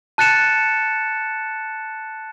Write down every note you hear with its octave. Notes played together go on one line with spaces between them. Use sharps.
A5 F#6 A6 C#7 E7